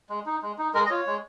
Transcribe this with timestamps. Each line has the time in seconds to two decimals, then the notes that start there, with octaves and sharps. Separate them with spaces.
0.10 G#3
0.26 D#4
0.42 G#3
0.58 D#4
0.74 G#3 A#4
0.86 D#5
0.90 F4 C#5
1.07 G#3